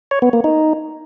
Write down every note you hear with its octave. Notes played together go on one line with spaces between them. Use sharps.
C#5
B3
A#3
D#4